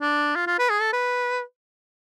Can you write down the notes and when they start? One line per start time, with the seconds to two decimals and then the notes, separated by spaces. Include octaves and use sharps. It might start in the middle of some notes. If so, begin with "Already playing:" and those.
0.01 D4
0.36 F4
0.47 F4
0.59 B4
0.70 G#4
0.81 A4
0.93 B4